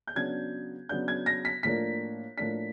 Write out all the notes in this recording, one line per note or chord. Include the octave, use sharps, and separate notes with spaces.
G6
C#3 F#3 B3 D4 G#6
C#3 F#3 B3 D4 G6
G#6
A#6
B6
A2 F3 A#3 D4 B6
A2 F3 A#3 D4 B6